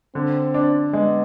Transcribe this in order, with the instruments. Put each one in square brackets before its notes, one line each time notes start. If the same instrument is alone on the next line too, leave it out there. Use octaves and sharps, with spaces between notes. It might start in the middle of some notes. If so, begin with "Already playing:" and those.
[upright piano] D3 [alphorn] C4
[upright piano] D4
[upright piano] G#3 [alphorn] B3